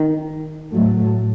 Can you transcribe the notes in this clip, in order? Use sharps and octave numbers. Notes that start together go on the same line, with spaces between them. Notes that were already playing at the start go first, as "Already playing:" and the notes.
Already playing: D#3
A2 F#3 A3